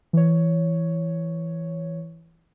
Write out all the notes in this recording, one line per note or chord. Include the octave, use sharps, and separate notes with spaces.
E3 C#5